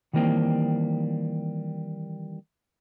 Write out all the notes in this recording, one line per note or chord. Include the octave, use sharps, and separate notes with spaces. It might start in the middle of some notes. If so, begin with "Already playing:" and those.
D#3 E3 G3 A#3 C4